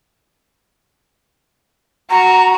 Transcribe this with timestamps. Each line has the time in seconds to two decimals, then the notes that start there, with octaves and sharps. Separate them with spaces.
2.10 F#4 A#5